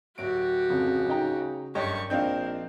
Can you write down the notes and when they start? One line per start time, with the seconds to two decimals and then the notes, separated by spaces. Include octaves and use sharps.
0.18 D1 F#3 F#4 G4 D7
0.70 F2 C#3
1.09 D#4 G5 A#5
1.75 F#1 G2 G4 C#5 D#5 G5 C#6
2.10 A#1 C4 D4 A#4 D#5 F5 G5 G6